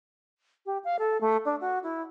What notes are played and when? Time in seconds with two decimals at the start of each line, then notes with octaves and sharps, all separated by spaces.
0.66 G4
0.84 F5
0.99 A4
1.21 A3
1.45 D4
1.61 F#4
1.83 E4